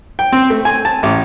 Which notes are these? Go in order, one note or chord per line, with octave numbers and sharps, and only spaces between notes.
G5
C4
A3
G#5
A5
A1